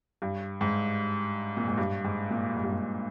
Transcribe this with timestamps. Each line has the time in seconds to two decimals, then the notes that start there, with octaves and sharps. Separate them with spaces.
0.22 G2
0.61 G#2
1.57 A#2
1.68 G#2
1.78 G2
2.04 G#2
2.30 A#2
2.56 G#2
2.64 G2
2.72 G#2